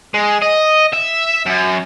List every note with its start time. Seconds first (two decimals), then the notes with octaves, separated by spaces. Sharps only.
0.14 G#3
0.42 D#5
0.93 E5
1.46 F#2